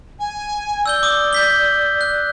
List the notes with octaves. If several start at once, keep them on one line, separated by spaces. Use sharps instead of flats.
G#5
D5 E6 G6 G7
D6 D#6
G6 B6 G7
F#6